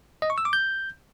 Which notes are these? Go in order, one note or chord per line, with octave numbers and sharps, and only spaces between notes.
D#5
C#6
E6
D6
G6